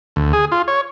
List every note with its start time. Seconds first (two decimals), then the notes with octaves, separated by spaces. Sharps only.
0.16 D2
0.33 G#4
0.52 F4
0.68 C#5